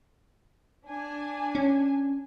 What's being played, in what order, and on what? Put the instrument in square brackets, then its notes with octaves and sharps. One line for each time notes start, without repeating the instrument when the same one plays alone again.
[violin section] D4 G#5
[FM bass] C#4